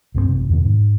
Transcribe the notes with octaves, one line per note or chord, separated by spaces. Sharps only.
C2 G2 G#3 C4
A1 F#2 C3
E2 B2 D#3 B3
G#2